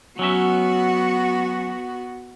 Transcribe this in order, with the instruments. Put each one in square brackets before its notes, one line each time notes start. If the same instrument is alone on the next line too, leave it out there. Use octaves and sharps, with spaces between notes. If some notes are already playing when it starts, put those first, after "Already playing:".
[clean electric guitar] F#3 C#4 E5 [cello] B3 F#4